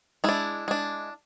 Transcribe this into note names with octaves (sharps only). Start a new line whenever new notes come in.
G#3 D4 E4
G#3 D4